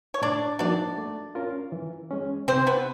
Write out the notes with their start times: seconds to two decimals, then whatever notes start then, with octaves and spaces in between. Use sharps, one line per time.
0.14 C#5
0.22 A2 D4 D5
0.59 F3 A#3 D4 D#4 F#4 D5
0.98 A3
1.35 C#4 F4 A#4
1.72 E3
2.11 G#3 C#4
2.48 C3 C4 C5
2.67 B3 B4